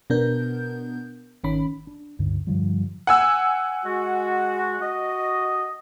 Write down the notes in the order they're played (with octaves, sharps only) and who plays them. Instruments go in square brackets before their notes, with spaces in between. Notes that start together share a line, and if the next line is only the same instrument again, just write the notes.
[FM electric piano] B2 B3 D4 A#4 G6
G#1 D#3 C#4 B5
[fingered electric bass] D4
C#2 G2 D3
G2 D3 F3 G3
[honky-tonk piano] F#5 G#5 E6
[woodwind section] G#3 F#4
F#4 D#5